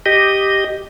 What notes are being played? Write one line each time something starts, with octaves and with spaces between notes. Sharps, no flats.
G4 D#5